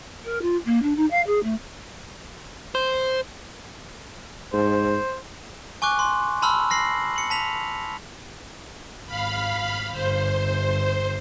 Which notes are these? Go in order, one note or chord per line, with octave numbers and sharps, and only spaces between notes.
A#4
F4
A#3
D4
D#4
F5
G#4
A3
C5
G#2 C5
G#5 C#6 D6 F#6
C6
A5 B5 C6 E6 F6
F6 A#6 C7 F#7
C#7 F#7
A5 B6 F7
G#1 F5 B5
G1 C5